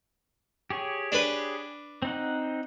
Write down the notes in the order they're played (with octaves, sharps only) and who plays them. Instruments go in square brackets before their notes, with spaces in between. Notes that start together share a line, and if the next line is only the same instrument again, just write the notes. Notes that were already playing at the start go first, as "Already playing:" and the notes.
[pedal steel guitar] G4 G#4 C#5
[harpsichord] D4 B4
[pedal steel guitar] C4 D#4 F#5